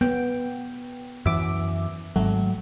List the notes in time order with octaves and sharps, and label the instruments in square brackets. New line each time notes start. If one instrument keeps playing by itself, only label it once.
[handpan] B3 [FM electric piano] G5
[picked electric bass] F#2 E3 [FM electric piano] E5 D6
[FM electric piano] G#1 A3 [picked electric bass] F#3